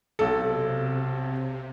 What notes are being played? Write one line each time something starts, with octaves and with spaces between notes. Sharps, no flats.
B1 C3 A4